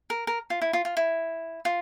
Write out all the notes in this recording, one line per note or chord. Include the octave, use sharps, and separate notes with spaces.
A#4
A#4
F4
E4
F4
F4
E4
F4